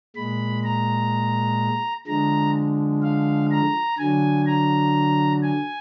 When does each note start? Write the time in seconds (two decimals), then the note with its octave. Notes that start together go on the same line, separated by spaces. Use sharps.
0.16 A#2 G#3 B5
0.64 A#5
2.07 D3 F3 G#3 A#5
3.03 F5
3.51 A#5
3.99 D3 F#3 G#5
4.46 A#5
5.43 G#5